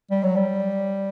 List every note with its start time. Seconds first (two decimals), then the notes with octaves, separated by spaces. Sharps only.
0.11 G3
0.23 F#3
0.36 G3